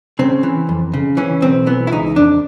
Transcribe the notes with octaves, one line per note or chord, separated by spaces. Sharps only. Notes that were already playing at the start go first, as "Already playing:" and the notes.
C#3 C4
E3
F2
C#3
E3 C#4
B1 C4
E3 B3
E4
C#2 D#4
F2 D4